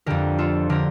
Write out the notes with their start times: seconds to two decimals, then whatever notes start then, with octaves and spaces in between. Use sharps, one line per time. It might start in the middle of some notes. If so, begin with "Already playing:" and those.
0.06 F2 D3 G4 A#4
0.39 F4 A4
0.69 D3 G4 A#4